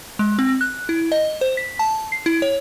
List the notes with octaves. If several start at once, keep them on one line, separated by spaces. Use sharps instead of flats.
G#3
C4
F#6
E4
D#5
C5
B6
A5
C7
E4
C#5